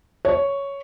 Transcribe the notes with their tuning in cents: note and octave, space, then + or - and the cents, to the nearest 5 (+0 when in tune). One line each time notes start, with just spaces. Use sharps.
C#5 +5